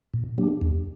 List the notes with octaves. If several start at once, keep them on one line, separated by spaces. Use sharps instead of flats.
A#2
F#3 A#3 D4 G4
E2